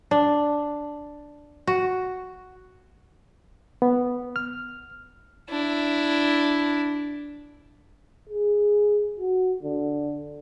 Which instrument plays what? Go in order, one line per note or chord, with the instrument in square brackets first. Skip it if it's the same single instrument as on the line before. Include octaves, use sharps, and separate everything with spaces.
[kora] D4
F#4
[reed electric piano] B3
F6
[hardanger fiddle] D4 E4
[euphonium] G#4
F#4
D3